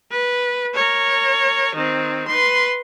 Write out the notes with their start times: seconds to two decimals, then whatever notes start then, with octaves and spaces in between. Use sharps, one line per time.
0.11 B4
0.74 A#4 C#5
1.75 D#3 C4
2.28 B4 C6